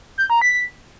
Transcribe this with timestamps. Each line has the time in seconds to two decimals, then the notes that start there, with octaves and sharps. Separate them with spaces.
0.18 G6
0.30 A#5
0.42 B6